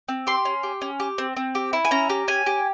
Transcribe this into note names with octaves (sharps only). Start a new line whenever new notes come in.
C4
G4 C6
C#4
G4
C#4
G4
C4
C4
G4
E4
G#5
C#4 A#5
G4
C#4 G#5
G4